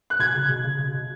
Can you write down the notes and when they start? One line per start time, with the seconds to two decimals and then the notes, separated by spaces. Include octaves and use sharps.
0.10 F#6
0.20 B2 G#6
0.35 C#3
0.45 C#3
0.49 B2
0.64 C#3
0.79 C#3
0.94 B2